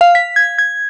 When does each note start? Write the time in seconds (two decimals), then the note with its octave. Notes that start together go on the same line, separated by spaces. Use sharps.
0.01 F5
0.15 B6
0.36 G#6
0.58 G#6